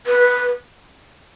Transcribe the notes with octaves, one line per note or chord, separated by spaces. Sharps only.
B4